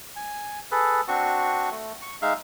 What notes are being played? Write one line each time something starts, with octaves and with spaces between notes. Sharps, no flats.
G#5
G#4 A4 B4
C4 D4 F#4 C#6
A3
C#6
G#3 D#4 E5 F5